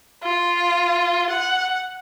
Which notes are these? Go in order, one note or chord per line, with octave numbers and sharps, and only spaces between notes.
F4
F#5